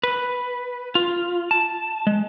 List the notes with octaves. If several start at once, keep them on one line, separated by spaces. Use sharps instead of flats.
B4
F4
A5
G#3